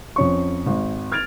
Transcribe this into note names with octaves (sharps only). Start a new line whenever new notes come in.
F2 C#4 C#6
G#1
F6 G#6 A6 D7 F7